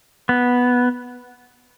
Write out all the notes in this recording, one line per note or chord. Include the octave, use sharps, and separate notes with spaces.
B3